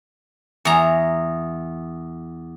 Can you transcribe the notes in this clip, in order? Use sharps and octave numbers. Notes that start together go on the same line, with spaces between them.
E2 A#5